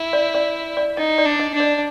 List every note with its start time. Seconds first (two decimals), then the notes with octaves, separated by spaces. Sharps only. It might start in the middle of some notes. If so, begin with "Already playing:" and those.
Already playing: E4
0.13 D5
0.34 D5
0.77 D5
0.97 D#4 D#5
1.18 D5
1.25 D4
1.40 D#5
1.54 D4
1.60 D5